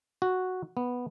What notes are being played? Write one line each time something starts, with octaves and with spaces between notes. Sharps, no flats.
F#4
B3